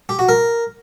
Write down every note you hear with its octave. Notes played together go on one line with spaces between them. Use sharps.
G4
F#4
A#4